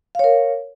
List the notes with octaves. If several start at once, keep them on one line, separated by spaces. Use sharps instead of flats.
A#4 C#5 F5